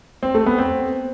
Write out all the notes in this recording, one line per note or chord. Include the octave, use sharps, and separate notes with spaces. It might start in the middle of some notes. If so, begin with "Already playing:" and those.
C4
A3
B3
C4